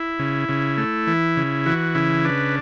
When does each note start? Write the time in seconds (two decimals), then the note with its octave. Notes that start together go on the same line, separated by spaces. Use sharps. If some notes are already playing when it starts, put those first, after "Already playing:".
Already playing: E4
0.19 C#3
0.49 C#3
0.78 A3
1.07 E3
1.37 C#3
1.66 E3 F#4
1.95 C#3 E4
2.25 D4 B4